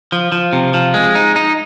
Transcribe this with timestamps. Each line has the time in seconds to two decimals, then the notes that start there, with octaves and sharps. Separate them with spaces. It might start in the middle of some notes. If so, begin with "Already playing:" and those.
0.12 F3
0.32 F3
0.53 C3
0.74 F3
0.94 G#3
1.15 D#4
1.36 D#4